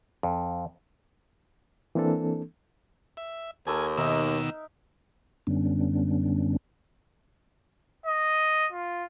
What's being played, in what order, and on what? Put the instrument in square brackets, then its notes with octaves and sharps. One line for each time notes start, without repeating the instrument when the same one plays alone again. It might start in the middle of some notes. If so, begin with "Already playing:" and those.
[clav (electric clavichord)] F2
[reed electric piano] E3 A#3 C4 D4 A4
[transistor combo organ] E5
[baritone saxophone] D#2 [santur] A4 A#4 E6 [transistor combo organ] G#5
[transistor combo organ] B2 D#3 E6 [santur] D#4 A#4 E5
[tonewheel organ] F#2 D3 G3 B3 C#4 D4
[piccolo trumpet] D#5
F4